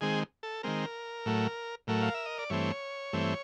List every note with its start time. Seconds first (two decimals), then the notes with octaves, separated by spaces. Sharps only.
0.01 D#3 G#3 C4 G#4
0.43 A4
0.63 D#3 G#3 C4 A#4
1.26 A2 F#3 A3
1.87 A2 F#3 A3 A#4
2.02 F5
2.14 E5
2.26 D#5
2.39 D5
2.50 G2 E3 A3 C4 C#5
3.13 G2 E3 A3 C4